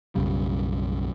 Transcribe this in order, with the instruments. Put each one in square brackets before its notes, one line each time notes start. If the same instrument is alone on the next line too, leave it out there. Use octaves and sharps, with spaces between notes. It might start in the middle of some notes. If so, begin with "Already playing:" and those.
[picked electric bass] B1 F#2 C#3 G3